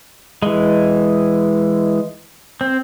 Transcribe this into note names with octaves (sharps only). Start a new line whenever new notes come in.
E3 G#3
C4